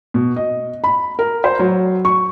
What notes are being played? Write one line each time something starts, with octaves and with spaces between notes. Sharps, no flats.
B2
D#5
B5
A#4
C5
F#3
C#6